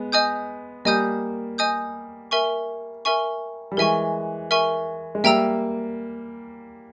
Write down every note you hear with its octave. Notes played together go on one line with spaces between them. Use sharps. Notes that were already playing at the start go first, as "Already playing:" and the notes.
Already playing: G#3 B3
D#5 G#5 D#6 G6
G3 A#3 D#5 G#5 D#6 G6
D#5 G#5 D#6 G6
A#4 E5 G#5 C#6
A#4 E5 G#5 C#6
G3
E3 G#3 A#4 E5 G#5 C#6
A#4 E5 G#5 C#6
G#3
G3 A#3 E5 G5 A#5 E6